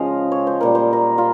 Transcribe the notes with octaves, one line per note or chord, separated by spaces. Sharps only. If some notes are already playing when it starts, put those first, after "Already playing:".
Already playing: C#3 F3 G#3 C5 D#5 F5
C#5
C5
A#2 G3 A#4
C5
A#4
F4